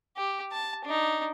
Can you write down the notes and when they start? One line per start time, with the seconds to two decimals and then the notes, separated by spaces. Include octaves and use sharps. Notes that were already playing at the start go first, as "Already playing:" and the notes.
0.17 G4
0.52 A5
0.85 D4 D#4